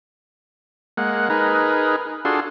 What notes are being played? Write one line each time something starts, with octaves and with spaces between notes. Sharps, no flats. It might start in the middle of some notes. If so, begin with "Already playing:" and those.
G#3 A#3 F#5
D#4 G#4 A#4 B4
D4 F4 F#4 G#4 A4 C6